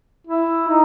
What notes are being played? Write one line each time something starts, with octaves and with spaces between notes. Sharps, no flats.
E4
D#4